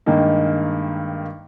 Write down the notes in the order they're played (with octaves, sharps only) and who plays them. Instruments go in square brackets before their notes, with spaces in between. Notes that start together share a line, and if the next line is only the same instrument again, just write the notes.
[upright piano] G2 D#3 G#3 A#3 D#4